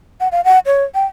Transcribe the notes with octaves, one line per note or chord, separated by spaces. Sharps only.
F#5
F5
F#5
C#5
G5